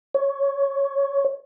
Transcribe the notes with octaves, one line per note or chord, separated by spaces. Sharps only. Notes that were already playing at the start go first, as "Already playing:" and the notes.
C#5